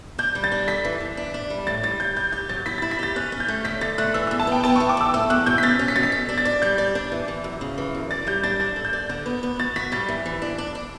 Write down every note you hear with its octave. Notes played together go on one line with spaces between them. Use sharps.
D4 G6
G3
A6
D4
A4 B6
E3
E3
D4
D4
G3
A2 A6
G3 A6
G3 G6
G4 G6
G4 G6
F#3 A6
E4 B6
E4 A6
B6
G4 A6
C#4 F#6
C#4
G6
A3
D3 B6
D3 A6
A3 F#6
E3 E6
E2 E6
A5
B3 G5
B3 A5
E3 C#6
D6
E2 E6
A3 E6
E2 F#6
B2 G6
B6
C#4 A6
C#4
B6
B2 A6
B6
A4
D4
A6
D5
G3 G6
D5
D4
E3
E3
F#2
C#3
E3
F#2
D5 A6
G3 G6
D4 A6
D4 A6
A4
G6
D5
D3
B3
B3
F#4 A6
F#4 B6
G3 A6
E3
E3
D4
D4
D4